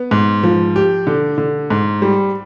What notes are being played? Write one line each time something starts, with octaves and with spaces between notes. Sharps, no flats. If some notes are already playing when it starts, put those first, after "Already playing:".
Already playing: B3
G#2
F3
G4
D3
D3
G#2
G3